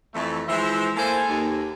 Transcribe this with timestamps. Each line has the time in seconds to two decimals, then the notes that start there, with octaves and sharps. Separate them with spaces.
0.15 F2 E3 A3
0.48 E3 F3 G#3 C5 E5
0.97 A#3 E4 A4 C5 G#5
1.28 D#2